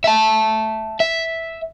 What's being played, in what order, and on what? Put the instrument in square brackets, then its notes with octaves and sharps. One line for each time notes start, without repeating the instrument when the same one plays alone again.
[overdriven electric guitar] E5 A5
E5